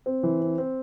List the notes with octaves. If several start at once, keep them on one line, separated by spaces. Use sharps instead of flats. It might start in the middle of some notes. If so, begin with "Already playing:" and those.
C4
E3
C4
C4